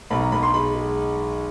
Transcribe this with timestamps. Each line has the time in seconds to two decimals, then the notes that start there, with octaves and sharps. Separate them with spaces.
0.10 B1 B5
0.21 A#5
0.32 B1 B5
0.43 C6
0.54 G#3 B5
0.75 G#3